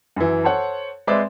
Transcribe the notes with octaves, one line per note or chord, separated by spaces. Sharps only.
F#2 E3
A4 C5 C#5 F#5
G#3 C4 B4 C5 D5 E5